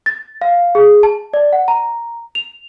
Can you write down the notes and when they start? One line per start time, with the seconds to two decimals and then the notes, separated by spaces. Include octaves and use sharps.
0.06 A6
0.42 F5
0.75 G#4
1.03 A5
1.34 D5
1.53 F#5
1.68 A#5
2.35 F7